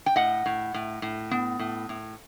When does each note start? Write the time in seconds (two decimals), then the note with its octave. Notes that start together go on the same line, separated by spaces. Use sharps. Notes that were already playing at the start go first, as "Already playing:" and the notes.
0.06 G5
0.16 A2 D#5 F#5
0.46 A2
0.74 A2
1.02 A2
1.31 B3
1.59 A2
1.89 A2